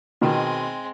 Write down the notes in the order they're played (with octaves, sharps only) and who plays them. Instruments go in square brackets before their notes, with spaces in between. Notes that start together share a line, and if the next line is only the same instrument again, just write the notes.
[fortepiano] B2 D#3 [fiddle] G#3 C4